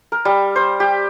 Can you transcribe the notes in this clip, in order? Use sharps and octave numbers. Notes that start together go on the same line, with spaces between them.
A#4
G3
C5
G4